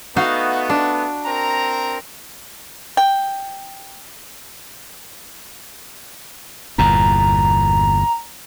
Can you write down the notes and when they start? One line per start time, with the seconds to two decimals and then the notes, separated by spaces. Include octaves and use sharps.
0.16 A3 B3 D#4 F#4 F5
0.70 D4
1.26 C4 A#4 A#5
2.97 G5
6.78 G1 E2 A#2 A#5